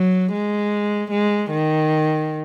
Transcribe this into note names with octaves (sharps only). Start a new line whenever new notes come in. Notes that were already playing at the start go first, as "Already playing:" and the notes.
Already playing: F#3
G#3
G#3
D#3